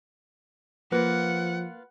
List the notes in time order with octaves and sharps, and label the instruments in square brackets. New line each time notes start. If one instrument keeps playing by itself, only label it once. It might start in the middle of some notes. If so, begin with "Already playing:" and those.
[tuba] F3 [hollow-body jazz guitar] A#3 [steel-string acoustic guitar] F4 B4 [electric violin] F#5